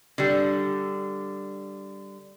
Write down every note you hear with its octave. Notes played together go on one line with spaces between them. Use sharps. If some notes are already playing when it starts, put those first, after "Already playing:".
D3 G3